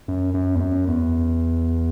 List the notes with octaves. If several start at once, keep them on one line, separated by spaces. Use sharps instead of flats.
F#2
F#2
E2
F#2
E2